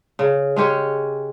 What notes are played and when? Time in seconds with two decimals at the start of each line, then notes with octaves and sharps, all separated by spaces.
0.19 C#3
0.56 G#3 C#4 G4 C#5